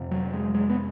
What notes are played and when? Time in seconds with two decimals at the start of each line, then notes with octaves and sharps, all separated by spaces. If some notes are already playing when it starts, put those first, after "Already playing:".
Already playing: F2 C3
0.11 F#3
0.34 G#3
0.54 G#3
0.70 B3